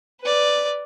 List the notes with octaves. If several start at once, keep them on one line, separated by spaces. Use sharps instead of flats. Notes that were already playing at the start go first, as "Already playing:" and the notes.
B4 D5